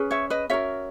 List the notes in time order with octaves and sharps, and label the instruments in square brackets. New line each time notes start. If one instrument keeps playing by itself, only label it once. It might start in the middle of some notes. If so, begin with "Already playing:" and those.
Already playing: [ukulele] C#4 G#4 B4
C#5 E5
B4 D#5
C#4 F#4 A#4 C#5 E5